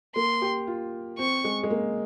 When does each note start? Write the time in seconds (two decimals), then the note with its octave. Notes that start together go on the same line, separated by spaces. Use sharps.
0.16 A#3 C6
0.42 G4
0.67 F4
1.18 C4 C#6
1.44 G#3
1.63 G#3
1.70 A#3